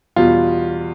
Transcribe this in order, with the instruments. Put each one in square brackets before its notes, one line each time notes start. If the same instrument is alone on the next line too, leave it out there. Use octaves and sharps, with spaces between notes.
[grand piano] E2 B2 G3 F4